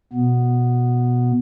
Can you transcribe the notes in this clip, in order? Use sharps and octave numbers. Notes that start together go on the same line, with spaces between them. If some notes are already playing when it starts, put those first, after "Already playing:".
B2 B3